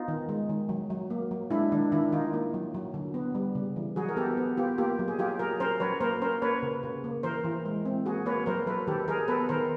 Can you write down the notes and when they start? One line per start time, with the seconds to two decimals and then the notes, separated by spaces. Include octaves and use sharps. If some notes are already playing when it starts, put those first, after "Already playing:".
Already playing: B3 D#4 F4
0.08 D#3
0.29 G#3
0.49 D#3
0.69 F#3
0.90 F#3
1.10 A#3
1.31 F#3
1.50 G#3 D4 E4
1.72 D#3 D4
1.92 D#3 D4 E4
2.12 D#3 D#4 F4
2.34 A#3
2.54 F#3
2.74 F#3
2.94 D3
3.14 B3
3.35 G3
3.55 C#3
3.76 E3
3.96 F#3 F#4 G#4
4.09 A#4
4.16 B3 G4 A4
4.37 B3
4.57 B3 F4 G4
4.78 A#3 F4 G4
4.99 F#3
5.08 G#4
5.19 F#3 F4 G4
5.39 F#3 G#4 A#4
5.60 C#4 A#4 C5
5.80 F#3 B4 C#5
6.01 A#3 A#4 C5
6.22 C#4 A#4 C5
6.42 A#3 B4 C#5
6.63 C#3
6.83 C#3
7.04 A#3
7.23 E3 A#4 C5
7.44 E3
7.65 G#3
7.85 C4
8.06 A#3 F#4 G#4
8.26 A#3 B4 C#5
8.46 F#3 A#4 C5
8.67 F#3 A4 B4
8.87 D#3 G4 A4
9.08 F#3 G#4 A#4
9.28 B3 A4 B4
9.49 D#3 A#4 C5